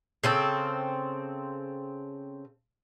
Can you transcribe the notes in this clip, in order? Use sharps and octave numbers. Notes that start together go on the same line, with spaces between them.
C#3 C4 A4